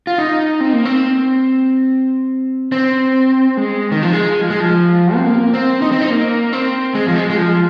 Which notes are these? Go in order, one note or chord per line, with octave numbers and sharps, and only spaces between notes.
F4
D#4
C4
A#3
C4
C4
G#3
D#3
F3
G#3
F3
G#3
F3
C4
A#3
C4
D#4
C4
D#4
A#3
C4
G#3
F3
G#3
G#3
F3